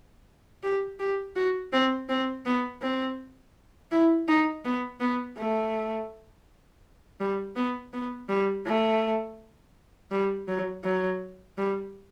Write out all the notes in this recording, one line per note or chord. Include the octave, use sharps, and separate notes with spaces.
G4
G4
F#4
C4
C4
B3
C4
E4
D#4
B3
B3
A3
G3
B3
B3
G3
A3
G3
F#3
F#3
G3